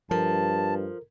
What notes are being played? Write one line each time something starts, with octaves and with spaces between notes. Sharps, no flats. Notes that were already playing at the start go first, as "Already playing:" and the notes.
G2 F3 A4 A#4 A5